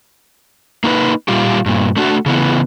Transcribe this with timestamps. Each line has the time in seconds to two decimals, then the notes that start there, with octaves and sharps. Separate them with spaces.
0.84 A#3 D#4 B4
1.28 A#2 G3 F4 G4
1.66 G2 A#2
1.97 A3 D4 F#4
2.26 C#3 E3 B3